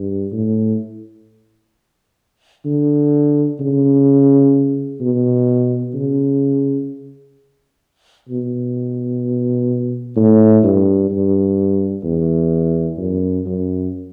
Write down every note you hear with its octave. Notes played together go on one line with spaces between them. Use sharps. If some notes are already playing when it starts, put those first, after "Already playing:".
Already playing: G2
A2
D3
C#3
B2
C#3
B2
A2
G2
G2
E2
F#2
F#2